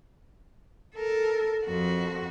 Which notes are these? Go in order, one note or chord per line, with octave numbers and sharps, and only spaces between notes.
A4 A#4
F2 F#4